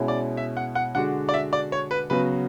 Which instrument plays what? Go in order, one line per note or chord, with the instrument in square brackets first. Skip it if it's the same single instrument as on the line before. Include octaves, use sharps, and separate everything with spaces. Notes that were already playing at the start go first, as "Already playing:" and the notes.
Already playing: [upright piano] B2 G#3 C#4 E4
[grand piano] D5
E5
F#5
F#5
[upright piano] D3 G#3 D4 F#4 [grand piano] F#5
[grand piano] D5
E5
D5
C#5
B4
[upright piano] C#3 F#3 B3 F#4 [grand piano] B4